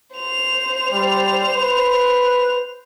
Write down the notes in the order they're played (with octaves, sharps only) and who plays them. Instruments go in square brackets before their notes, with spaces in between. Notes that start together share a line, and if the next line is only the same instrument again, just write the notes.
[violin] C5 F7
[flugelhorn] G3
B4